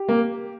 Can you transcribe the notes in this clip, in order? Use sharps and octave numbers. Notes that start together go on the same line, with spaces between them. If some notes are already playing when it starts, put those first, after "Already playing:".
Already playing: G4
A#3